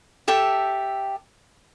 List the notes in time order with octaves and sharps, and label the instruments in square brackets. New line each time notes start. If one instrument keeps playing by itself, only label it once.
[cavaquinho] G4 A4 E5 G5